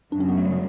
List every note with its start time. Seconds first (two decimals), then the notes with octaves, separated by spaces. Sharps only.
0.12 F#2 C#3 F#3 D4
0.20 C#4
0.29 B3
0.37 A3
0.45 G3